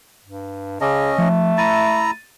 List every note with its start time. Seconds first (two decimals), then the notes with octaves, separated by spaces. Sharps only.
0.24 G2
0.81 C#3 C#4 D#5 A5 D6
1.18 F3 A3
1.58 E4 A#5 A6 D#7